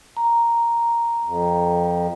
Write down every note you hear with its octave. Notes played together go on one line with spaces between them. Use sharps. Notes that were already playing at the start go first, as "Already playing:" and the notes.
A#5
F2